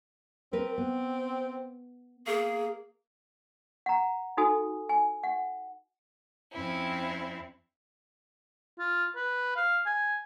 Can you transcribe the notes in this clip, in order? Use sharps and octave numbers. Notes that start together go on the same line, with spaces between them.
C4 A#4 B4
B3
A#3 G#4
F#5 A#5
D#4 F#4 A4 G#5 D#6
G#5
F#5
F2 C4 C#4 E4
F4
B4
F5
G#5